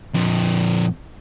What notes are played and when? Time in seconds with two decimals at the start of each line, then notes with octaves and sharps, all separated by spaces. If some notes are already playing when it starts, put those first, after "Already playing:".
0.14 F2 A#2